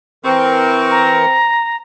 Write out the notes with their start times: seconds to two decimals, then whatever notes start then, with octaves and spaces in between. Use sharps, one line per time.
0.25 E3 C4 A#4 C#6
0.91 A#5